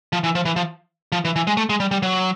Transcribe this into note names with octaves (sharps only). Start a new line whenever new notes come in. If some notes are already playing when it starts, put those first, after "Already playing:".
F3
E3
F3
E3
F3
F3
E3
E3
G#3
A3
G#3
G3
G3
F#3